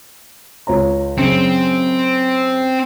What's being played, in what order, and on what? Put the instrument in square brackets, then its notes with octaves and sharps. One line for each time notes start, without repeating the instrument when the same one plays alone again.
[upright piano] C#2 C#5 A#5
[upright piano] F#2 C#3 C#7 [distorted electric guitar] C4